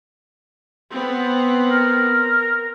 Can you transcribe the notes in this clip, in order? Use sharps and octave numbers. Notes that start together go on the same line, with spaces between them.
B3 C4
A#4